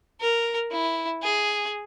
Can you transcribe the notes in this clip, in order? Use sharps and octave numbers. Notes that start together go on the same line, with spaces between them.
A#4
E4
G#4